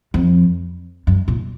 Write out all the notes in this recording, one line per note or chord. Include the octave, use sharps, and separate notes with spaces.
F2
F#2
A#2